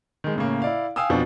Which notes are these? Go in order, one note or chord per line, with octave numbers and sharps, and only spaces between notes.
D#3 G#3
A2 C#3 A#3
E4 D5 F5
F5 G5 G#5 D#6 E6
F2 B2 F3 D4